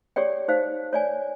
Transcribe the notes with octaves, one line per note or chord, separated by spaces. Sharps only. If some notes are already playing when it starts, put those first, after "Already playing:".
G4 G#4 C#5 D5 G5
D#4 C5 F5
C#5 D5 G#5